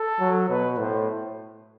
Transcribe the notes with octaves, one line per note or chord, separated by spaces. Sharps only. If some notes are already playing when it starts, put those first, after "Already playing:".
Already playing: A4
F#3
B2 B4
A2 C5